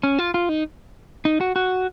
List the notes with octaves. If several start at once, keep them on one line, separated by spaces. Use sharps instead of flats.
C#4
F4
F4
D#4
D#4
F#4
F#4